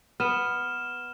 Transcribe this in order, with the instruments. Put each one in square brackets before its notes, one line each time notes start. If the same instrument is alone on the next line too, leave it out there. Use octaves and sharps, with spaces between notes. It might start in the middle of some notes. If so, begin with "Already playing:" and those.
[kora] B3 [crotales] F6 E7